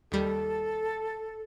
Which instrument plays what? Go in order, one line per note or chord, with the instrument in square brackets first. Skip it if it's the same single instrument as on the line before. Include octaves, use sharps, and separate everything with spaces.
[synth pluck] D#2 G3 [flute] A4